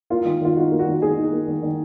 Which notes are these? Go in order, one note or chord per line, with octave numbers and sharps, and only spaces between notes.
A#3 F4
D#3
D#3 F4
D#4 F#4
A#3
F#4
D#3
D#3 G#4
D#4
A#3
D#3
D#3